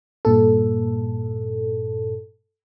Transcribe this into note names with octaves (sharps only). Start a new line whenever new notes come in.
G2 A#2 A4